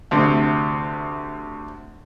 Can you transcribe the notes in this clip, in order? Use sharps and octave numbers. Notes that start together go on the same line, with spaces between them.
D2 C3